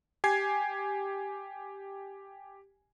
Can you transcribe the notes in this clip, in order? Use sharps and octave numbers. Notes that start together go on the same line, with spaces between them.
G4 G#5 G#6 C7